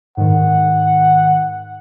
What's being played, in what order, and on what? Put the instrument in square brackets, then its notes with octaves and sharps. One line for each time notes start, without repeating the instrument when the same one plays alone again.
[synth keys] G#2 D#3 [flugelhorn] F#5